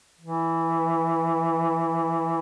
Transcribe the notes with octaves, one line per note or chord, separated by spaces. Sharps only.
E3